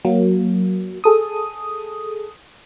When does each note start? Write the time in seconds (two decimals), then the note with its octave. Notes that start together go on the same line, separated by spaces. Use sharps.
0.05 F#3 A#3
1.04 G#4 A4 D#6